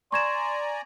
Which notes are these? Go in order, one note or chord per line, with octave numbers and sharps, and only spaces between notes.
D5 G#5 A#5 C6 C#6 G#6 E7